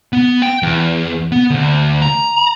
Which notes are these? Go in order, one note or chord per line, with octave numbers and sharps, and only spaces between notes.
B3
G5
E2
B3
D2
A#5